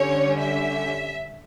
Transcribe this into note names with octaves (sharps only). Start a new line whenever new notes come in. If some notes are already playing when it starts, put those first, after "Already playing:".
Already playing: D3 G3 C#4 C#5
E5